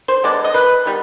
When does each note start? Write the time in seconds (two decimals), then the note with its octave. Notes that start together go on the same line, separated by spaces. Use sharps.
0.08 C5
0.23 D3 G#3 B3 D5
0.44 D#5
0.54 B4
0.86 D#3 G3 B3